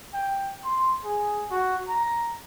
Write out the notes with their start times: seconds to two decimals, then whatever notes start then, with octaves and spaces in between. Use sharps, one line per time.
0.13 G5
0.64 C6
1.05 G#4
1.50 F#4
1.88 A#5